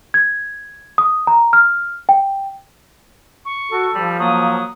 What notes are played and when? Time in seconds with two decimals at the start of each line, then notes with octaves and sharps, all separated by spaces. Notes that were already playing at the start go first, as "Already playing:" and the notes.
0.14 G#6
0.98 D#6
1.27 A#5
1.53 F6
2.09 G5
3.45 C#6
3.71 F#4 A4
3.95 F3 G3
4.20 F#3 A#3 D#6